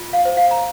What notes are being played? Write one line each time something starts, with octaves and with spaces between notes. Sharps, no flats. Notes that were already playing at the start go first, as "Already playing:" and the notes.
Already playing: F4
F5
C5
F5
A#5